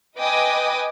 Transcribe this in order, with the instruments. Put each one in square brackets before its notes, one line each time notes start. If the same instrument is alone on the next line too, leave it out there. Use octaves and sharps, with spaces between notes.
[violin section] B4 D#5 G5 G#5 D6 D#6